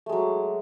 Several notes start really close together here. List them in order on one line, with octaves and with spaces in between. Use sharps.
A3 G#3 F#3